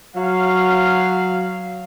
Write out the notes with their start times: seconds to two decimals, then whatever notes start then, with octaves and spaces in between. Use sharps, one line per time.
0.16 F#3 F5